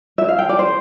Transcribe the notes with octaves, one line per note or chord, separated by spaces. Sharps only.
E5
F5
G5
D5
C5